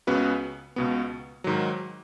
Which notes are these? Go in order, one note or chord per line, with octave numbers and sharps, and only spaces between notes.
C#2 C#3 B3 F#4 B4
C#2 B2 B3
G#2 D#3 F#3